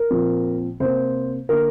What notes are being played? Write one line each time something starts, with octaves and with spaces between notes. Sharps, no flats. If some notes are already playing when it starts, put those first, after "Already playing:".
Already playing: A#4
A#2 F3 C4
C3 A#3 C5
D3 A#3 A#4